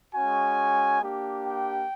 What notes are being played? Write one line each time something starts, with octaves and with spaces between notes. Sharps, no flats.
G#3 C#4 F#4 G#5
A#3 D4 G4
G5